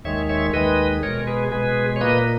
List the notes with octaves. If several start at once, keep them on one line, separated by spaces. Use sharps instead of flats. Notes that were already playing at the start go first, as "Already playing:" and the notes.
D#2 D#3 G#3 C#5 E5
C#5 E5
D#2 D#3 G#3 B4 D#5
B2 G#3 A#4 C#5
G#4 B4
B2 G#3 G#4 B4
C#5
A#2 A#3 B4 D#5